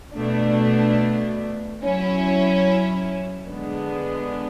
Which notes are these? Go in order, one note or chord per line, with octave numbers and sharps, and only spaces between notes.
B2 A3 D4
F#3 C#4 E4
D3 G#3 B3 D4